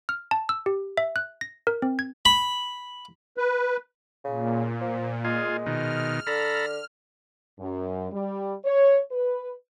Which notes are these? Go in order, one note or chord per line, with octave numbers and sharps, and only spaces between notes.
F6
A5
E6
G4
E5
F#6
A#6
A#4
C4
G#6
B5
B4
A#2 C#3
F3
G#3 F4 G#4
B2 D#3 F6
D3 A4 A#5 B5
F#2
G3
C#5
B4